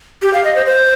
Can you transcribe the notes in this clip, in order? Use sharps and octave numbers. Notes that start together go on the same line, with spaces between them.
G4
F5
D#5
C5
C5